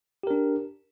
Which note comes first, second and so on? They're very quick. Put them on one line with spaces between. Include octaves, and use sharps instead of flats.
G4 A#4 D4